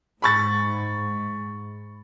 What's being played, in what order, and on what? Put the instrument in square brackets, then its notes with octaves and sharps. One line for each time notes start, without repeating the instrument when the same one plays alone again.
[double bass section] G#2 [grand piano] B5 C#6 A6